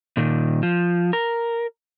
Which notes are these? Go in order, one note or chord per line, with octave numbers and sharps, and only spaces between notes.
A#2 D#3
F3
A#4